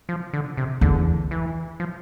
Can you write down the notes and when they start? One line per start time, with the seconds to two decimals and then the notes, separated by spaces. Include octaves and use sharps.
0.09 F3
0.33 D3
0.57 C3
0.81 E2 D3
1.31 E3
1.80 F3